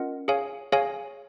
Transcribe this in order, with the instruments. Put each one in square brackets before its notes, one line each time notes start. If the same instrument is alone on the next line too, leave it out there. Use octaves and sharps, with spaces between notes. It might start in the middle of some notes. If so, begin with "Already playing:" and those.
Already playing: [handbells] C#4 F4 A#4 D#5 F#5
G#4 C#5 F5 G#5
G#4 C#5 F5 G#5